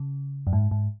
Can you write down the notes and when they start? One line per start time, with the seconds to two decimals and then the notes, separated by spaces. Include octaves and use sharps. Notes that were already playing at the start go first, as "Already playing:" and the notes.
Already playing: C#3
0.47 F#2
0.53 G#2
0.71 G#2